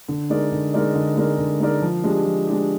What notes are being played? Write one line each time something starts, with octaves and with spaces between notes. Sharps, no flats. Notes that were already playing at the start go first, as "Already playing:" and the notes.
D3
G#3 D#4 A#4 D5
D3
G#3 D#4 A#4 D5
D3
G#3 D#4 A#4 D5
D3
G#3 D#4 A#4 D5
F3
G#3 D4 G4
F3
G#3 D4 G4